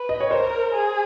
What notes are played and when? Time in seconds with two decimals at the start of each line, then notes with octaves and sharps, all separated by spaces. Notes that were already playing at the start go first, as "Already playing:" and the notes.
Already playing: B4
0.09 D#5
0.20 C#5
0.30 A#4 C5
0.74 G#4